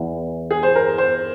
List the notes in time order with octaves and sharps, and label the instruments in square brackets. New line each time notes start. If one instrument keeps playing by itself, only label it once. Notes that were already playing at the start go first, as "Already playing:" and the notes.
Already playing: [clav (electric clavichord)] E2 E3
[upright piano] G#4
C5
A#4
C5